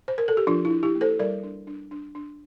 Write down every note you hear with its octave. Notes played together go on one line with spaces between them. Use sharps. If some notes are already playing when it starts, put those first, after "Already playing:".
C5
A#4
A4
G4
F3 D4 F4
E4
D4
E4 G4
A#3
A4 C5
G3 A#4 D5
D4
D4
D4
D4